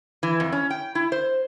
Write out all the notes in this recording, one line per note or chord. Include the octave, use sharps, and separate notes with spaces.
E3
F2
C#4
G5
E4
C5